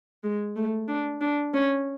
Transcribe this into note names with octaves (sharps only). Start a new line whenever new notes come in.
G#3
A3
D4
D4
C#4